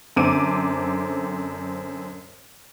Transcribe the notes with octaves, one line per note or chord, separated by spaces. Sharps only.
F#2 D3 C4 D6 D#7